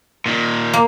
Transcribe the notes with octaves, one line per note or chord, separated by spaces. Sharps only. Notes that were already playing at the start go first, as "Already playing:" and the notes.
A#2 D#3
A#3